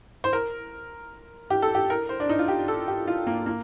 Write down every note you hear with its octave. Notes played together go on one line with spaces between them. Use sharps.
C5
A#4
G4
A4
G4
A#4
C5
D4
D#4
F4
G4
A4
G4
F4
A#3
A#3